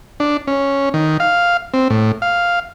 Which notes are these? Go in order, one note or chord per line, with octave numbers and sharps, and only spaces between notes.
D4
C#4
D#3
F5
C4
A2
F5